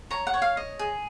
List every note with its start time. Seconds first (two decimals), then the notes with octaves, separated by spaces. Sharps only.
0.11 C#5 A#5
0.27 F#5
0.34 C#5
0.42 F5
0.57 D#5
0.79 G#4